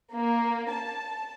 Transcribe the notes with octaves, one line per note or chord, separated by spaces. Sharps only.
A#3
A5